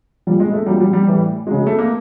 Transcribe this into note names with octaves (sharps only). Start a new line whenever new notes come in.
A#2 F3 G3
G#3
A3
A#2 F#3 G3
G3
G3
A2 E3 G3
C#3 F#3 G#3
A3
A#3